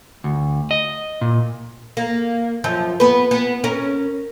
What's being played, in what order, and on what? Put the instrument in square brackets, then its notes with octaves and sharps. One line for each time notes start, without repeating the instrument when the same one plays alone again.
[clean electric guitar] D2
D#5
A#2
[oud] A#3
F#2 F3
B3 B4
B3
C#4 A#4